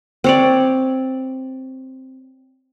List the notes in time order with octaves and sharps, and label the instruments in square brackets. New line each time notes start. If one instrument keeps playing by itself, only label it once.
[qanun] C4 C#5 D5